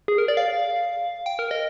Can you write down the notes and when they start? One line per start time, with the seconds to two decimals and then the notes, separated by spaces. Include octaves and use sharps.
0.08 G#4
0.18 A#4
0.28 D5
0.37 F5
1.26 G5
1.39 A#4
1.51 D#5